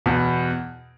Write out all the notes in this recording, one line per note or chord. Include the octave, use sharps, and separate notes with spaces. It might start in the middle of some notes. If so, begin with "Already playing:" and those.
E2 B2